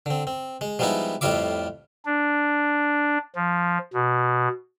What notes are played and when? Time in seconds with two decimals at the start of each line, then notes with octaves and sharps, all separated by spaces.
0.06 D3 C4
0.27 C4
0.61 G#3
0.79 F3 G3 G#3 B3 D#4 E4
1.21 F2 A2 G3 F4 E5 D6
2.05 D4
3.35 F3
3.94 B2